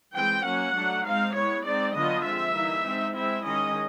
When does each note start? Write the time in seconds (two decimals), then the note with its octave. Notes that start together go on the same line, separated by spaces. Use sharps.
0.15 E3 G#3 C4 G5
0.45 F#3 A#3 C#4 F#5
0.75 F#3 A3 D4
1.05 G#3 C4 D#4 F5
1.34 G#3 B3 E4 C#5
1.65 G#3 C4 D#4 D5
1.95 D3 F#3 B3 D4 F4 D#5
2.24 F3 G#3 C4 E5
2.54 E3 G3 A#3 D#4
2.84 G#3 C4 D#4
3.14 G#3 C4 E4 E5
3.44 D#3 G#3 C#4 D#5